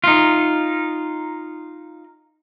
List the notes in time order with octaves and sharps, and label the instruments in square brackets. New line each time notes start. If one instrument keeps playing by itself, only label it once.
[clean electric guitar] D#4 F4